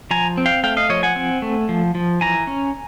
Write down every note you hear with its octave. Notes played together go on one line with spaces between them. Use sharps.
F3 G#5 A#5
C4
F5 G5
A3 F5 G5
D#5 F5
F3 C#5 D#5
F#5 G#5
C4
A3
F3
F3
E3 G#5 A#5
C#4